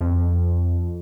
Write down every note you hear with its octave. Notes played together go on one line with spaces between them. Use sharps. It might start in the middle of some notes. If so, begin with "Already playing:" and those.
F2